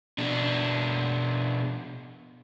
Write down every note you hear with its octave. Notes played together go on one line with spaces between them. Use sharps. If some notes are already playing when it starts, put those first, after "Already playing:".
B2 D4